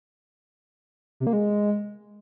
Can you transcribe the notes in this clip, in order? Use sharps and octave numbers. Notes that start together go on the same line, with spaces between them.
C3
A#3
G#3